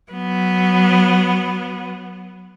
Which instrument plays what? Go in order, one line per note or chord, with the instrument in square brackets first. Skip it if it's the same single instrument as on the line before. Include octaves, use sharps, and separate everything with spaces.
[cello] F#3 B3